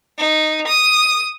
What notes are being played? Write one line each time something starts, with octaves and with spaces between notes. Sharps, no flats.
D#4
D#6